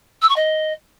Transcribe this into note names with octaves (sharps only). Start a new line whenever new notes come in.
E6
C#6
D#5